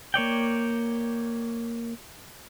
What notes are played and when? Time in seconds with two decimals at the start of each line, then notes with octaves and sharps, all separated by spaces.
0.14 A#3 C#5 D5 G5